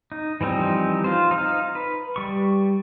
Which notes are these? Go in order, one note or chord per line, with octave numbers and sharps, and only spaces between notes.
D#4
E3 F3 G3 C4 D#4
F4 C5
D#4 F5
B4
G3 C#6